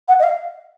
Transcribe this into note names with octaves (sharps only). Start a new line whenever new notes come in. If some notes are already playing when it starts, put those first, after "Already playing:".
F#5
D#5
F5